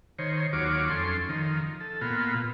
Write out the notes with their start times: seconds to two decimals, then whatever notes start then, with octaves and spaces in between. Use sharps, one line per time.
0.19 D#3 C5 C#5
0.53 D#2 F#3 F4 C#5 D6
0.90 F2 C#4 A4 C6
1.29 D#3 F3
1.80 A4
2.01 A#2 B3 F4